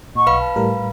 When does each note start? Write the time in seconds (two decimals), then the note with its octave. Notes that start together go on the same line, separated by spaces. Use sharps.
0.15 A#2 D#5 F#5 C#6
0.27 B1 B4 F5 B5
0.41 A5
0.56 A2 G3 A#4